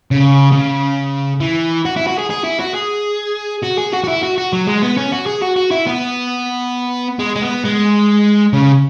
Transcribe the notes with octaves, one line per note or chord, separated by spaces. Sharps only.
C#3
C#3
E3
F#4
E4
F#4
G#4
G#4
E4
F#4
G#4
F#4
G#4
F#4
F#4
E4
F#4
F#4
F#3
G#3
B3
C#4
F#4
G#4
F#4
F#4
E4
B3
G#3
G#3
B3
G#3
C#3